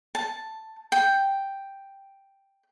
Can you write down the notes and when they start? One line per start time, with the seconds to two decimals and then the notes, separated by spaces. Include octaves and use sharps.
0.15 A5
0.92 G5